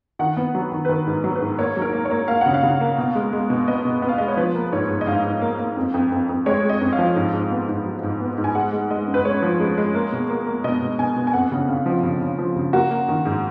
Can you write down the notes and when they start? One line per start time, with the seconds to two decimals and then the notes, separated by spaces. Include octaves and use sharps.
0.19 D#3 F#5
0.37 B3
0.55 F#3
0.72 D#3
0.85 B4
0.89 D#3 A#4
1.07 G#2
1.24 F#3
1.36 B4
1.41 G#2
1.59 A#3 C#5
1.77 F#3 A#4
1.93 A#3
2.05 C#5
2.11 A#3
2.28 A#3 F5
2.41 C#3 F#5
2.54 F5
2.63 C#3
2.81 A#3
2.98 B2
3.15 G#3
3.33 G#3
3.50 B2
3.68 B3 D#5
3.85 B2
4.02 B3
4.09 F5
4.18 G#3 D#5
4.28 C#5
4.37 F3 B4
4.55 A#3
4.72 G#2 C#5
4.90 G#2
5.01 D#5
5.07 G#2 F5
5.24 G#2
5.41 A#3
5.59 A#3
5.77 F2
5.94 F2
6.12 F2
6.29 F2
6.46 G#3 C#5
6.64 G#3
6.69 D#5
6.81 F2
6.93 F5
6.99 F3
7.16 G#2
7.33 G#2
7.51 B3
7.68 G#2
7.86 F#3
8.03 G#2
8.20 B3
8.38 G#2
8.44 G#5
8.55 G#3 F#5
8.73 G#3
8.90 G#3 D#5
9.07 F#2
9.14 B4
9.25 G#3 C#5
9.42 F3
9.60 G#3
9.77 G#3
9.94 A#3
10.12 B2
10.30 A#3
10.47 A#3
10.64 B2 D#5
10.82 B2
10.99 B2 G#5
11.16 B2
11.27 G#5
11.33 F2 F#5
11.52 C#3
11.69 C#3 F5
11.86 F3
12.03 C#3
12.21 C#3
12.39 F3
12.56 C#3
12.73 A#3 F#4
12.91 A#3
13.08 D#3
13.25 G#2